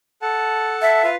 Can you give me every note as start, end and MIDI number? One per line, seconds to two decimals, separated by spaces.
0.22 1.02 69
0.22 1.02 78
0.22 1.02 81
0.82 1.09 76
1.04 1.15 65
1.04 1.15 71
1.04 1.15 77